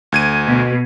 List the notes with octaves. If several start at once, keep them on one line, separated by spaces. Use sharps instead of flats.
D2 G#6 D#7
B2